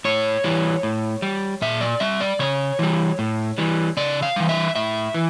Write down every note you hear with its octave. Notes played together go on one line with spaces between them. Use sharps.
A2 C#5
E3 G3
A2
G3
A#2 E5
D5
G3 E5
D5
C#3 C#5
E3 G3
A2
E3 G3
C#3 D5
F5
E3 G3
E5
A2 E5
E3